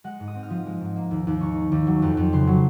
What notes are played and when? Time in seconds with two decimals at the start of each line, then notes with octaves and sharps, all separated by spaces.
0.04 G#3 F#5
0.20 G#2
0.28 D#6
0.35 C4
0.43 F6
0.50 F3 D#6
0.66 G#3
0.81 G#2
0.96 A#3
1.11 D#2
1.27 D#2
1.41 D#3 C#6
1.56 A#3
1.72 D#2
1.87 F#3
2.02 F2
2.17 F2
2.33 C#3 C6
2.47 F#3